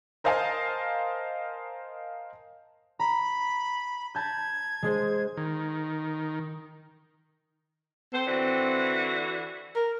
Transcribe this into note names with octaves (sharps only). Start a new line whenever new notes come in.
A#4 C5 D#5 F5 G#5 A5
A#5 B5
A5 G6 G#6
G#3 G#4 C5
D#3
C4 A4 C5
D3 E3 F#4
A#4